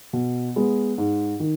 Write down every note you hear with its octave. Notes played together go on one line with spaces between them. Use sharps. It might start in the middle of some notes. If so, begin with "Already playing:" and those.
B2
G#3 B3
G#2
D#3